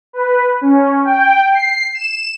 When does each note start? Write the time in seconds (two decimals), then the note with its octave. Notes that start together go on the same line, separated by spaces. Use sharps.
0.13 B4
0.61 C#4
1.05 G5
1.54 C7
1.95 E7